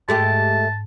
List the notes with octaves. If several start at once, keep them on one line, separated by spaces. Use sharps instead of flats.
G#2 G#3 A3 G4 A5